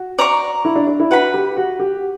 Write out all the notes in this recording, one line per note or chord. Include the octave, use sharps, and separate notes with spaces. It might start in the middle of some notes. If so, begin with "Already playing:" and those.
Already playing: F#4
D5 A#5 C#6
E4
D4
D4
E4
F#4 B4 F#5 B5
G4
F#4
G4